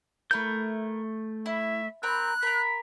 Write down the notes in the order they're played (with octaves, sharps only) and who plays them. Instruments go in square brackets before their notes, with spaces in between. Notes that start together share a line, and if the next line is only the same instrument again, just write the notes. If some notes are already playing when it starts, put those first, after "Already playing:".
[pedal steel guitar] A3 G6 [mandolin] E4 A#4
[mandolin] E4 [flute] E5
[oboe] C4 [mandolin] A#4 A#5 B5 [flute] F#6
[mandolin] A#4 A#5 [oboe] B5